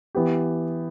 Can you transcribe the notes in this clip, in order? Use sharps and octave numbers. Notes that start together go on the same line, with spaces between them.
E3 B3 G4